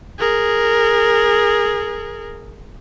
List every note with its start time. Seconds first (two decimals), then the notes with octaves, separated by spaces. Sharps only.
0.18 G#4 A#4